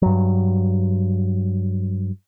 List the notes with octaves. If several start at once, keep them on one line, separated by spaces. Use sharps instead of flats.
G2 F#3